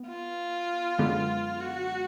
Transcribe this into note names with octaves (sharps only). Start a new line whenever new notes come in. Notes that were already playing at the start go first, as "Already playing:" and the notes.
Already playing: B3
F4
F#2 D3 G#3 B3
F#4